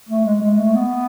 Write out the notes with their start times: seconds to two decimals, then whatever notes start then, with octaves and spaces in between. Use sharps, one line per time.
0.09 A3
0.25 G#3
0.42 G#3
0.58 A3
0.75 B3